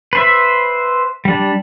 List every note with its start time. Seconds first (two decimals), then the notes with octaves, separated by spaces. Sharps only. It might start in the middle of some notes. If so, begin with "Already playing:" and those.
0.13 B4 C5 E5
1.25 G3 D4